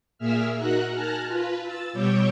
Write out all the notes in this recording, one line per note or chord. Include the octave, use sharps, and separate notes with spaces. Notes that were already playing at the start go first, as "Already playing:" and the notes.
A#2 A#3 G#4 E5 E6 F6
D#4 F#4 A#4 F#6 A#6
G#5 A5 F6 F#6 A#6
F4 B4
E6 A6
B2 G3 C#5 D6 E6 G6